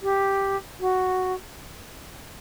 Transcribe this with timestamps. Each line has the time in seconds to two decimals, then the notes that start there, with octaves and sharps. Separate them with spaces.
0.02 G4
0.80 F#4